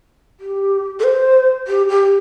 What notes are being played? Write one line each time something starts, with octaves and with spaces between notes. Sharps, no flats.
G4
A4
C5
G4
G4